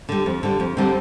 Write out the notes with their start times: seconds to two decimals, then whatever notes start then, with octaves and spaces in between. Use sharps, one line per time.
0.09 D3 G3
0.26 F2
0.43 D3 G3
0.60 F2
0.77 D3 G3 C4 D#4